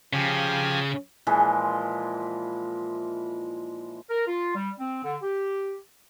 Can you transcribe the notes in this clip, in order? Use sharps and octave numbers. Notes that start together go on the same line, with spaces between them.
C#3 F3 G4 G#5
A#2 E3 F3 G#3
A#4
F4
G3
C4
D3
G4